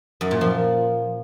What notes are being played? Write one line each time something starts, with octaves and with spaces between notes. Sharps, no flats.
F#2
A#2
F3